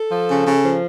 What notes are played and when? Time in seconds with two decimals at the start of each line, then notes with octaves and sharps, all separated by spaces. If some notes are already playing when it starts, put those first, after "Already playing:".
Already playing: A4
0.11 F3
0.29 C#3
0.47 C#3
0.64 F3